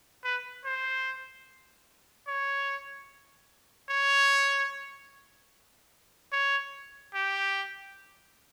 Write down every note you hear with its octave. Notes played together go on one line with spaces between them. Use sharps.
B4
C5
C#5
C#5
C#5
G4